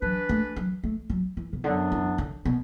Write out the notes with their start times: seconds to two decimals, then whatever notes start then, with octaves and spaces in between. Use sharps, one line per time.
0.02 E3 F#3 D4 B4
0.29 A3
0.56 F#3
0.83 A3
1.10 F#3
1.37 E3
1.53 B2
1.64 F#2 D3 F#3 B3 D4
1.92 E3
2.18 D3
2.45 B2